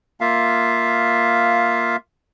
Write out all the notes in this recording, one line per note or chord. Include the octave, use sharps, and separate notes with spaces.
A#3 F4 E5 F5